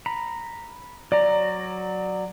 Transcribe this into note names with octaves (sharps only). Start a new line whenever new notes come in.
A#5 B5
F#3 D5 A#5